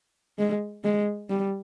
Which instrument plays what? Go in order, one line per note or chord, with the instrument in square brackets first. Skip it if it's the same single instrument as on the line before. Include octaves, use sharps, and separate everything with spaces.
[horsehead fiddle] G#3
G#3
G3